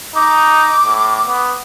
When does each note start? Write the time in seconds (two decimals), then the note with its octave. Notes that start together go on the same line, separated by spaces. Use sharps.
0.15 D#4 D6
0.85 A2
1.27 B3